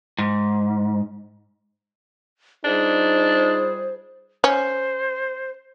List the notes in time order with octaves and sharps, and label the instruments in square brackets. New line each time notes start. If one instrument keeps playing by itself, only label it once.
[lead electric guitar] G#2
[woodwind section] G3 F4 G#4 [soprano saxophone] D4 [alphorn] D#4 [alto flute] C5
[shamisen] C#4 [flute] C5